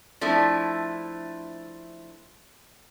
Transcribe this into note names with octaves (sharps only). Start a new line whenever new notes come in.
F3 A3 D4 E4